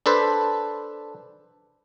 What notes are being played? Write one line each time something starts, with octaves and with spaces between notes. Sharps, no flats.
D4 A4 B4 C5